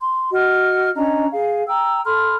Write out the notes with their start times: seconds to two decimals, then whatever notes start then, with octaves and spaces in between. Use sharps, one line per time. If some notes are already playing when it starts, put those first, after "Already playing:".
0.02 C6
0.32 F#4 D#5 F6
0.95 C#4 D4 D#5 A#5
1.31 G#4 F5
1.68 G5 A#5 E6
2.04 A4 B5 C6 F6